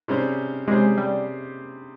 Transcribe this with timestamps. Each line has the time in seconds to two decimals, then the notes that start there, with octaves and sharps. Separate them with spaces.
0.08 C3 G3 C#4 G#4 C5
0.68 C3 G3 G#3 C#4 G#4 C5
0.98 G3